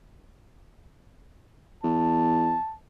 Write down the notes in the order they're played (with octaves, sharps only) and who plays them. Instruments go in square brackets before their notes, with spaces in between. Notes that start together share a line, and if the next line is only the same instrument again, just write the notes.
[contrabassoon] E2 [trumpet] A5